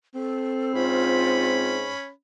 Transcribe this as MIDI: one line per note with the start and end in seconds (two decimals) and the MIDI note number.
0.15 1.82 60
0.15 0.73 69
0.75 1.90 44
0.75 2.09 61
0.75 1.73 65
0.75 2.09 83